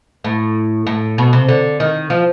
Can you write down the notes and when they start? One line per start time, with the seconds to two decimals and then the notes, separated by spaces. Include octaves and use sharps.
0.24 A2
0.87 A2
1.18 B2
1.33 C3
1.48 D3
1.80 D#3
2.10 F3